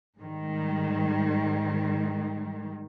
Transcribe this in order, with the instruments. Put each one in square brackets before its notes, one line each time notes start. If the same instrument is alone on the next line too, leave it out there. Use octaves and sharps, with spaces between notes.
[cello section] G#2 D#3 G3